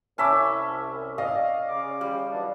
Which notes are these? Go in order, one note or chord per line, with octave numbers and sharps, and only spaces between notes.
C2 C#4 E5 G#5 A5 B5 D6
D5 D#5 F5
C#3 D6
G3
E3 F#3 D4